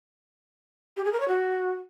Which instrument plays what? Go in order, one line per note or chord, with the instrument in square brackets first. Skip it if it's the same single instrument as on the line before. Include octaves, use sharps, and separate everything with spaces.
[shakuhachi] G4
G#4
A#4
C#5
F#4